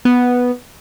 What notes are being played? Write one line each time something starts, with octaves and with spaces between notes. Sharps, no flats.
B3